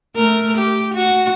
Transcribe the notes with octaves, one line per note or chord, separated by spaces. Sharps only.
A3 A#4
G4
F#4